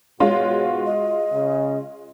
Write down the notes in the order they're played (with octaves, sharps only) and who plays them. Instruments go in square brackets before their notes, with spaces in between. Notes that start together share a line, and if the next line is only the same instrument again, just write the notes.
[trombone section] G#2 B2 F#4 [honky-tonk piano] G#3 F4 C6 [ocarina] C#5
[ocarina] D#5
[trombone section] C#3